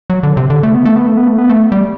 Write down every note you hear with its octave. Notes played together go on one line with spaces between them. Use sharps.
F#3
D3
C3
D3
A3
B3
A3
B3
A3
B3
A3
B3
A3
G3